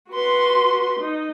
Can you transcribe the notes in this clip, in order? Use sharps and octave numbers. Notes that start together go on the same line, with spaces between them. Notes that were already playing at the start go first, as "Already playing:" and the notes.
F#4 B4 C6
D#4